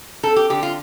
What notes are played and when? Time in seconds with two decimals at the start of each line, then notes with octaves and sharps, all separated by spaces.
0.23 C4 A4
0.36 G4
0.50 D3 G4
0.63 F4